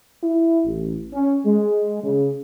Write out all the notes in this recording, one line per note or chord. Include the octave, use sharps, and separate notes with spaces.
E4
A1
C#4
G#3
C#3